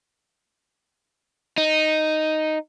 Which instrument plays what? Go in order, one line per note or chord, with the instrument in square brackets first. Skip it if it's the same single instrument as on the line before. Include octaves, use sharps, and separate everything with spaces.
[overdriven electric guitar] D#4